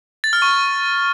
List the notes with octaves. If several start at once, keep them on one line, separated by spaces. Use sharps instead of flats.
A6
F6
C#6